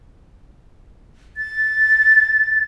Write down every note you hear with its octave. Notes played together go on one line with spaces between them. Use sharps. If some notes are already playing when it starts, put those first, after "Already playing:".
A6